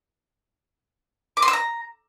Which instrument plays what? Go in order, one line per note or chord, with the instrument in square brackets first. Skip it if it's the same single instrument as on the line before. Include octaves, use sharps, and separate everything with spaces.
[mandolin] D6
C6
E6
A#5